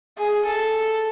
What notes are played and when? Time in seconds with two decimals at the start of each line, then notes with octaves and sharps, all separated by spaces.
0.18 G#4
0.46 A4